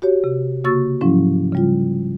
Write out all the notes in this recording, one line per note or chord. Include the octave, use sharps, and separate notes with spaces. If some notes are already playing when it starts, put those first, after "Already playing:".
F#4 G4 C#5
C3
C#3 A#3 F#4 C#6 E6 A6
G#2 F3 F#3 C#4 E4
C#3 G3 F4